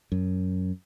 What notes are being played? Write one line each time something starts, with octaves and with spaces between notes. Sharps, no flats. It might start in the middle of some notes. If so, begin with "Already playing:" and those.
F#2